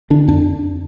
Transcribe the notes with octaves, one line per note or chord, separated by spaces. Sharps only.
D3 D4
F2 D4